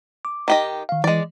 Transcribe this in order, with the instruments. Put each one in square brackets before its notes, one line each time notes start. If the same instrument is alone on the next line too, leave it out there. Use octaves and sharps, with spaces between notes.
[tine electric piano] D6
[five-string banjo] D#3 G4 D#5
[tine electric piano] D#3 F5
[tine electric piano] E3 [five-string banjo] G#3 D5